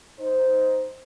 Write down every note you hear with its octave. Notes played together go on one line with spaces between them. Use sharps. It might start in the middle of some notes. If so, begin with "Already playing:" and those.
D#4 C5